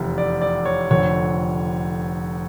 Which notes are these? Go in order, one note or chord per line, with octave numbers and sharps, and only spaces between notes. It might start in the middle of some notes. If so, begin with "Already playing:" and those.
Already playing: F1 E2 C3
D5
D5
C#5
F1 F2 D3 C#5